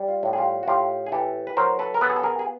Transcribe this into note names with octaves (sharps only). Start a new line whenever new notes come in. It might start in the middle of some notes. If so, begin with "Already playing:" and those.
Already playing: G3
F4
A2
G#4
F4 G4
F#4
A2 F4 G4
G#4
E3 G4 A4
B4
F#3 A#4 C5
A4 B4
A#4
B3 A4 B4
G#4
A4
G#4 A#4
G#4